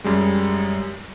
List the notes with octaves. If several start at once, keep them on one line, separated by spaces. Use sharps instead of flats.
F#2 G3 G#3